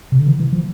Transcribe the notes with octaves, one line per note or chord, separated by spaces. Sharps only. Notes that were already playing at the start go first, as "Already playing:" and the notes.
C3
D3
E3
E3
F3